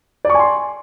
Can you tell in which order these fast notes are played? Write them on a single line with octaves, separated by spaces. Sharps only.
D5 C#6 G#5 C6